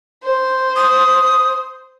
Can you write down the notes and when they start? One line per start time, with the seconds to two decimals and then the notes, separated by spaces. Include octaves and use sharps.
0.24 C5
0.76 D#6